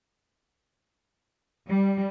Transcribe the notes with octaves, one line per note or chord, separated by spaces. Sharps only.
G3